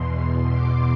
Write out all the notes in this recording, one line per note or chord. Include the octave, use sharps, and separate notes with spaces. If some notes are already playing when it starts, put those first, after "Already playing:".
Already playing: E2 B2 C6
D6